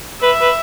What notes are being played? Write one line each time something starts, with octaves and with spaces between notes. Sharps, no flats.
B4 E5
B4